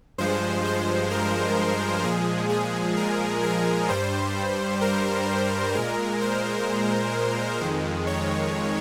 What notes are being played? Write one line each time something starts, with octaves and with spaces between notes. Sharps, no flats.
G2 F3 G#3 C5
C5
A#4
A#2 F3 G#3 G#4
G#4
A#4
A#4
G2 G3 C5
A#4
A#2 G#3 A#4
C5
F2 D#3 G#3
C#5